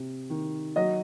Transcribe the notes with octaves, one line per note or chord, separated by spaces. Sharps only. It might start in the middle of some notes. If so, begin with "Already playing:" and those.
Already playing: C3
D#3
F#3 D#5